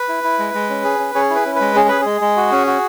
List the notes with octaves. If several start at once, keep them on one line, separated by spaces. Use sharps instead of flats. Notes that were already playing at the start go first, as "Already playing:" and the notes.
Already playing: B4
E4
E4
G#3
G#3
C#4
G#4
C#4
C#4 G#4 C#5
E4 B4
C#4
B4
G#3
C#4 G#4
G#4 B4
G#3 G#4
G#3
F#4
C#4
F#4